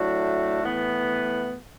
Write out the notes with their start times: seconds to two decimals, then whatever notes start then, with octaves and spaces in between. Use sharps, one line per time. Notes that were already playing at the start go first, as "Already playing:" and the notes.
Already playing: A2 F#3 A3 D4 F#4
0.63 A2 E3 B3